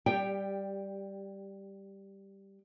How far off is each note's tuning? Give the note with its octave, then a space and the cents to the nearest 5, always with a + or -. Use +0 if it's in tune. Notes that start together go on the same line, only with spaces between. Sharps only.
G3 +0 G4 +20 G5 +0